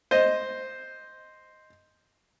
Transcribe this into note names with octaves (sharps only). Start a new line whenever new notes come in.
C5 D#5